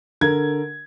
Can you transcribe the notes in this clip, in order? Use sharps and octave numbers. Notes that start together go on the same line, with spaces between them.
D3 A#4 G#6